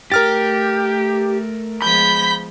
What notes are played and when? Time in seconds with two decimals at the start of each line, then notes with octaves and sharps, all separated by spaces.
0.12 A3 G4 A#4 F6 A6
1.82 F3 G#3 B3 B5 G6 B6